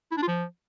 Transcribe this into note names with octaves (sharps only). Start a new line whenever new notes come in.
E4
D4
F4
F3